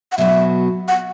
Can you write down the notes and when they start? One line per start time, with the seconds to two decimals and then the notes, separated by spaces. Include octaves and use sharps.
0.12 F#5
0.18 B2 F#3 B3 F#4 E5
0.88 F#5